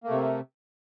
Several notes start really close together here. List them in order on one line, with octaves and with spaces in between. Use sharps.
A#3 A3 C3